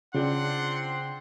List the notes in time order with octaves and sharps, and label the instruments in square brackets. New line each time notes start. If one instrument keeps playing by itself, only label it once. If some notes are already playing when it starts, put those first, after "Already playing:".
[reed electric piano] C#3 [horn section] C4 D4 C6 [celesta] F4 G#4 D5 [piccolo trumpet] F#5